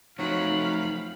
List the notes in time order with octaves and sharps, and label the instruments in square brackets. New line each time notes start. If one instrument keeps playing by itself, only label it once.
[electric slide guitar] F3 A3 C4 [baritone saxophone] F#3 [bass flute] D#4 [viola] F5 B5